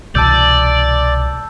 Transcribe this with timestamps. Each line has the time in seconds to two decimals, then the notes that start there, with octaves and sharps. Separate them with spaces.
0.15 C2 B2 E3 D5 A5 E6 G6